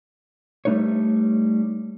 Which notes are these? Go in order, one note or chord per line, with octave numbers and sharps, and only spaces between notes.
G3 A3 D#4 B4 C#5